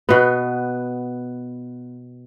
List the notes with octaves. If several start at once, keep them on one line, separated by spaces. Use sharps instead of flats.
B2 B3